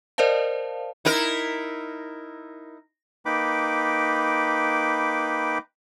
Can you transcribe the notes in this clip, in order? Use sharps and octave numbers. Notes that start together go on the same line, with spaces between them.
A#4 C5 D5 D#5 F5 A5
D#4 E4 A#4
A#3 D#4 B4 G5 B5 D6